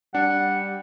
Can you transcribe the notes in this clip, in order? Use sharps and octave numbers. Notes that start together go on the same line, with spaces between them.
G3 D4 F#5